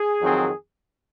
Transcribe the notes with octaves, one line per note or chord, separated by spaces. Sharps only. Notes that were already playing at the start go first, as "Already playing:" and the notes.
Already playing: G#4
F2 D#3 F#3 C4